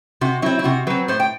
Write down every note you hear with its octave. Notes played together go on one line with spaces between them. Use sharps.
C3 F#4
F#3 C4 E4
E4
C3 F#4
F#3 C4 B4
A2 C5
G5